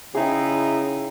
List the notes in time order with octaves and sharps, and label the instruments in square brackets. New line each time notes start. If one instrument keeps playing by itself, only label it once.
[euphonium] C#3 [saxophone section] D#4 E4 [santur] G#4 G5